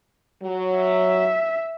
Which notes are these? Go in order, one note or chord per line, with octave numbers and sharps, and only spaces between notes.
F#3
E5